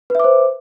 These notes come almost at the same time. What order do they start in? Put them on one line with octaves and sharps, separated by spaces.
B4 E5 D6 C5